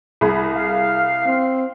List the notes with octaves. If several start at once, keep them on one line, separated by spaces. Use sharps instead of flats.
C2 G#4 B5
F5
C4